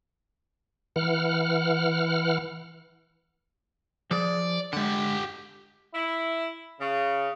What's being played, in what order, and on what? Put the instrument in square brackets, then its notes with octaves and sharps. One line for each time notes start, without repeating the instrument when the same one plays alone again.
[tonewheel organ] E3 F#5 F6
[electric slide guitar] F3 G#4 [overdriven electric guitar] D5
[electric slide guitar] D3 G#3 [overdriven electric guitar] G4 F#5
[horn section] E4
C#3